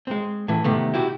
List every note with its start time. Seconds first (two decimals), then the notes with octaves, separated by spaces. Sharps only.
0.07 G#3 C4
0.48 A2 E3
0.64 C3 D#3 A3 B3
0.94 E4 F#4 G4